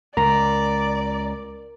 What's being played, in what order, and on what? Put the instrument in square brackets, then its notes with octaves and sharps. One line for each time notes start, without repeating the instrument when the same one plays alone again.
[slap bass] C#2 [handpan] A#4 [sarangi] D5 [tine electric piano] A#5